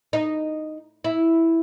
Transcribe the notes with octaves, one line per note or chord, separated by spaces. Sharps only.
D#4
E4